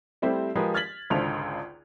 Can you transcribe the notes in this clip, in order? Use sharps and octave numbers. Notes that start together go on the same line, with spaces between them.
G3 A3 C4 E4 G4 C5
F3 G#3 G4 G#4 A#4 B4
F6 G#6 A6 B6 F#7
G#1 C#2 D3 C5 A5 F7